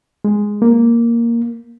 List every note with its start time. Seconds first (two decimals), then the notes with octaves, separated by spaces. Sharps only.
0.25 G#3
0.62 A#3